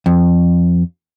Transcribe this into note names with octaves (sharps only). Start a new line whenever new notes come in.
F2